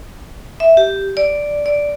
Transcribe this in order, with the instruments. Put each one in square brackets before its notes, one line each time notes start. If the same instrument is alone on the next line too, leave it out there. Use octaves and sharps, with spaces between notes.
[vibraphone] E5
G4
D5
D5